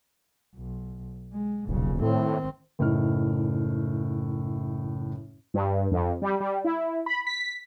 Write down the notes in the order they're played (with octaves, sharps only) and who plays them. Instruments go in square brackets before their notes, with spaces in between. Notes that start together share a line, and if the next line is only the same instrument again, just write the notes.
[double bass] B1
G#3
[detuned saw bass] D#1 [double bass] B1 C#3
[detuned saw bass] A2 [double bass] D#3 C4
[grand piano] F#1 A2 D#4 F6
[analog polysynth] G2
F2
G3
G3
E4
B5
B6